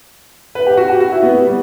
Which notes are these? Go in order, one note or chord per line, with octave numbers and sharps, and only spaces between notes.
B4
G4
F#4
G4
F#4
E4
B3
G3